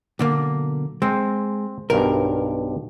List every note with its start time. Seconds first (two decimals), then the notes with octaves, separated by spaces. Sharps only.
0.19 B1 D3 A#3
1.02 G#3 C4
1.90 B1 G2 A#4